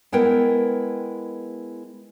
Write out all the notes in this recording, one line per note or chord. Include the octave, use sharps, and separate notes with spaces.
G#3 B3 E4 A#4 G5